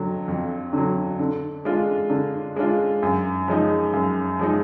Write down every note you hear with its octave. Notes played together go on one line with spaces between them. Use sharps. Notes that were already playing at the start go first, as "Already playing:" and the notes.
Already playing: F2 D3 F#3
F2
D3 F#3
D3
G#3 D4 F4
D3
G#3 D4 F4
F#2
F3 G#3 D#4
F#2
F3 G#3 D#4